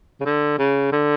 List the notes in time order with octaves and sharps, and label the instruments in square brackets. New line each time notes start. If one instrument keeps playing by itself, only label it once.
[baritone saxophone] C#3
D3
C#3
D3